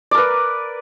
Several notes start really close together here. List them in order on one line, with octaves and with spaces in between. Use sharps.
D5 A#4 B4